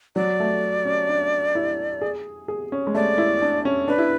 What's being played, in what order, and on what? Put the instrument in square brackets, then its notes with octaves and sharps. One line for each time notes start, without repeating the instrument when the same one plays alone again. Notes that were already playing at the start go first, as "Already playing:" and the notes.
[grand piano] F#3 [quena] D5
[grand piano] A3
C#4
D4
E4
G#4
G#4
C#4
G#3
[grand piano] A3 [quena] D5
[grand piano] E4
D4
C#4
[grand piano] D4 [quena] B4
[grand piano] E4